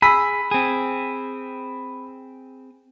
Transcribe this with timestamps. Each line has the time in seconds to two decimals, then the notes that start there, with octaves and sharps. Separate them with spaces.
0.02 G#4 B5 E6 B6
0.51 C4 G#4